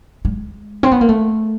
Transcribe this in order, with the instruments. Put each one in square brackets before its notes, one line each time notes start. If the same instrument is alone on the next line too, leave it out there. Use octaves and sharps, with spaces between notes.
[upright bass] G#3
C4
B3
A#3
A3